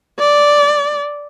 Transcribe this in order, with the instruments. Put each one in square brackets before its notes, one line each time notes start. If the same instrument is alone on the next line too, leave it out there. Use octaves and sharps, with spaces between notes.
[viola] D5